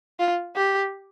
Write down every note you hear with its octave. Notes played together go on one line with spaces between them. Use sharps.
F4
G4